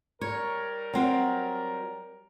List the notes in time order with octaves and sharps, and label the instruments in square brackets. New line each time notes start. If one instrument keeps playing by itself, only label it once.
[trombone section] G3 A#4 [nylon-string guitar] C#5
[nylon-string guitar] F#3 C4 F#4